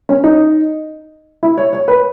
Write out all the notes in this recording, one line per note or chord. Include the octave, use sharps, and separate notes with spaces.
C#4
D#4
E4
C#5
C#5
B4